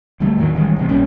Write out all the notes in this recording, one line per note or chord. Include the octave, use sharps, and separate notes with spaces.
D2 G3 A3
E2 A2 D#3 F#3
A1 D#3 G3 G#3
A1 C3 G#3
B1 A#2 G3 C#4